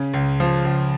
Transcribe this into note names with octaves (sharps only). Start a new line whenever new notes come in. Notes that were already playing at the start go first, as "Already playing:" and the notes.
Already playing: C#3
C#2
F3
C#2